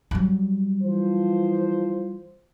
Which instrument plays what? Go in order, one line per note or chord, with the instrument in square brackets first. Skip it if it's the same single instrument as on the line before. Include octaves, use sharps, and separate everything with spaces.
[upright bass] F#3 G3
[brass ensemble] E3 F3 C5